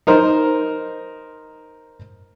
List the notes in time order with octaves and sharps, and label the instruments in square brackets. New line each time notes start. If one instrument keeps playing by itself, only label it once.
[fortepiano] D#4 A#4 C5